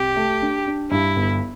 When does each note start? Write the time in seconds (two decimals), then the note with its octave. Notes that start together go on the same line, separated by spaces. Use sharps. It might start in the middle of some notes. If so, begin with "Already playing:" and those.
Already playing: C2 G4
0.16 A3
0.42 D4
0.67 D4
0.91 G2 E4
1.16 G1